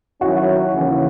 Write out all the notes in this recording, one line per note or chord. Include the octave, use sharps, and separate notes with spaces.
D#3 F#3 C#4 E4 F#4
D#2 C#3 E3